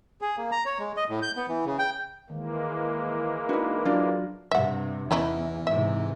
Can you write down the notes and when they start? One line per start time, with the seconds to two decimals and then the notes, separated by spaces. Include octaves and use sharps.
0.21 G#4
0.37 A#3
0.52 A#5
0.66 C#5
0.79 G#3
0.97 D#5
1.09 A2
1.22 G6
1.36 B3
1.49 E3
1.66 C#3
1.79 G5
2.30 D#2 E3 G#3 A#3
3.49 D4 D#4 F#4 B4
3.85 F#3 D4 F4 D5
4.51 G2 C3 E5 F#5
5.11 E2 E3 C#4 D#4 E4
5.67 G#2 C3 E5